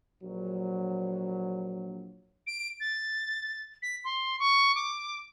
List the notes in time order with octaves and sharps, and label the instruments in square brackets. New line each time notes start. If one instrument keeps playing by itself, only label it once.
[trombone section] A#1 F#3
[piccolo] D7
A6
B6
C6
C#6
D6